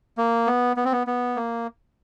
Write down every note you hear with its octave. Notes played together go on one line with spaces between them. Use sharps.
A#3
B3
B3
C4
B3
B3
A#3